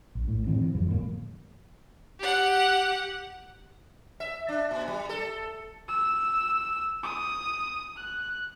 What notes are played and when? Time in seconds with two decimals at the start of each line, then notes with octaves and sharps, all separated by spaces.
0.15 A#1
0.28 A2
0.47 A2 D3 E3 C4
0.61 E3
0.75 F#2 D3 F3
0.88 E1 A2 G#3 A#3
2.20 G4 F#5
4.20 E5
4.49 D4
4.71 A#2
4.88 G3
5.09 A4
5.88 E6
7.03 D#6
7.96 F#6